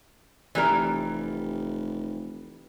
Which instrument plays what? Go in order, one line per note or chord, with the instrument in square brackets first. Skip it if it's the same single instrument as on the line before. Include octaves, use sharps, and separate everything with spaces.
[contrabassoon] F1 [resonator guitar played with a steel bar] E3 G3 A#4